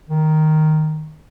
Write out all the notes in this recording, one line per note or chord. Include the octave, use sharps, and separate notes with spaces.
D#3